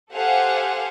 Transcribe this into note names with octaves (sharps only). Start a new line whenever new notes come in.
G4 A4 C5 F5 F#5 G#5